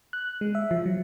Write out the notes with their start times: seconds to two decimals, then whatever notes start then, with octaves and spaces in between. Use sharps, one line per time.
0.13 F#6
0.41 G#3
0.55 E5
0.71 F3
0.86 F#3